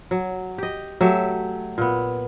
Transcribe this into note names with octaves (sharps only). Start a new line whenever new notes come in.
F#3
G4 D#5
F#3 A3 G4 E5
A#2 B3